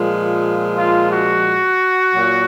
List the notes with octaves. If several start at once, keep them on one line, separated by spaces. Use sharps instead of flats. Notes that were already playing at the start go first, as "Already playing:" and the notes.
Already playing: A#2 F3 G#3
F4
F#4
A#2 F#3 A#3